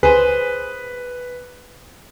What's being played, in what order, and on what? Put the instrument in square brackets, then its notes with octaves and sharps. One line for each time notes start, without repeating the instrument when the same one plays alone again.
[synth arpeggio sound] C#2 [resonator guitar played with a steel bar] G#4 C5 [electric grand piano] B4